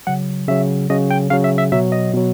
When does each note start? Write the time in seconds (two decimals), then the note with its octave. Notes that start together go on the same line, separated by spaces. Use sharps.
0.07 C#3 F#3 F#5
0.48 C#3 F#3 E5
0.90 C#3 F#3 D#5
1.11 G5
1.30 C#3 F#3 F5
1.44 E5
1.58 E5
1.72 B2 F#3 E5
1.92 D#5
2.13 B2 F#3